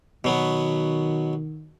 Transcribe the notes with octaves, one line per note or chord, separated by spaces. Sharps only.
B2 D#3 F#3 B3